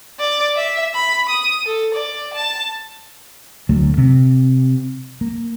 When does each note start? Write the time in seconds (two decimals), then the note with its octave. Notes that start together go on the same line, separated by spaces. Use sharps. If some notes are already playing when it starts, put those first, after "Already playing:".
0.20 D5
0.56 E5
0.94 B5
1.30 D#6
1.66 A4
1.95 D5
2.34 A5
3.69 D2 F#3 A3
3.98 C3
5.21 A#3